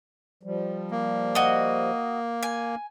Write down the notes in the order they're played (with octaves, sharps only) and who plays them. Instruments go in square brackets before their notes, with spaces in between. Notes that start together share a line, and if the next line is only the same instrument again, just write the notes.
[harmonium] F3 G3
[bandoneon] A#3
[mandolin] F#4 D#5
G#5